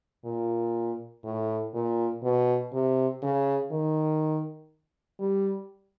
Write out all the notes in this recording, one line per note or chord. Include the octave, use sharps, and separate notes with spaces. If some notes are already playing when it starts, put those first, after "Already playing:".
A#2
A2
A#2
B2
C3
C#3
D#3
G3